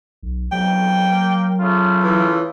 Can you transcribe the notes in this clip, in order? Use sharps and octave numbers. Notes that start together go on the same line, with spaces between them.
B1
B1 F2 F#3 G5
A#3
C#3 A3 F4
E3